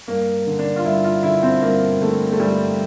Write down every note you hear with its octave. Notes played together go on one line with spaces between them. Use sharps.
G2 A#3
D3
D4
F4
G2 E4
F4
D3 E4
C4
G2 A#3
D3 A3
A3
G2 G3